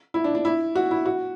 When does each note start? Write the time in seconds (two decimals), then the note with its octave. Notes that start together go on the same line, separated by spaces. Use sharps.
0.14 E4
0.24 D4
0.35 D4
0.45 E4
0.75 F#4
0.91 E4
1.06 F#4